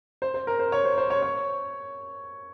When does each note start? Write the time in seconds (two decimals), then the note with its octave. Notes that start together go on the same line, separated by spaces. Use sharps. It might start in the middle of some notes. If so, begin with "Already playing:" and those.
0.22 C5
0.34 C5
0.47 A#4
0.59 C5
0.72 C#5
0.85 C5
0.98 C5
1.10 C#5
1.22 C#5